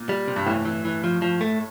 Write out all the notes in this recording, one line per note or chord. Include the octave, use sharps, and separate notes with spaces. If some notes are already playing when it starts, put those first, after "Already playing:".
Already playing: A#2
G3
C3
G2
A2 E3
E3
E3
F3
F3
A3